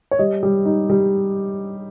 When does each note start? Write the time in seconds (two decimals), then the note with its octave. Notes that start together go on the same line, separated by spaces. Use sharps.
0.11 C#5
0.19 G3 D#5
0.43 G3
0.65 D#4
0.90 G3